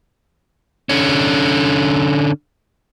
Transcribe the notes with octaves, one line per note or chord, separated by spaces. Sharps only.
D3 C#4